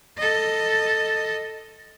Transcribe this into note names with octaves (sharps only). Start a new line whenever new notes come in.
A4 D#5